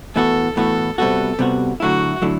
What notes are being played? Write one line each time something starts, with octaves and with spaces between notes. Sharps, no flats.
A2 E3 B3 F#4 A4
A2 E3 B3 F#4 A4
C3 G3 B3 F#4 A4
C3 G3 B3 F#4
D3 F#3 A3 E4 F#4
D3 F#3 A3 E4